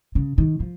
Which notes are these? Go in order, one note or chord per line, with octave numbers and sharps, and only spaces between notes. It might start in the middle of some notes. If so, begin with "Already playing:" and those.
C#3
D#3
F3